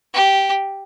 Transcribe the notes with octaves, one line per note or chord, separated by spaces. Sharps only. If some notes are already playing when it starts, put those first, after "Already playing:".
G4